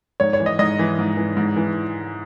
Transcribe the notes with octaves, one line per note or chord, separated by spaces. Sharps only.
G#2 C#5
C#5
E3
D#5
G#2 D#5
E3
G#2
E3
G#2
E3